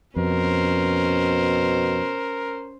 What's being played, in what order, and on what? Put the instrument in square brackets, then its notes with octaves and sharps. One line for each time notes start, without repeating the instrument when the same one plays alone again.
[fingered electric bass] F2 [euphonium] B2 [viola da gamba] C#4 C5 [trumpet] A#4